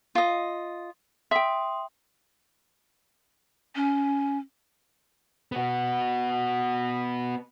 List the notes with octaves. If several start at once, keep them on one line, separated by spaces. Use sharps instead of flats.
F4 D#5
E5 G5 C6 D#6
C#4
B3 F#4